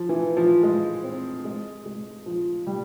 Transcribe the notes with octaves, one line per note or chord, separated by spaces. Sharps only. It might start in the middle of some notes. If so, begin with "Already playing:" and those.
Already playing: F3
E3
F3
G#3
C4
G#3
G#3
F3
G3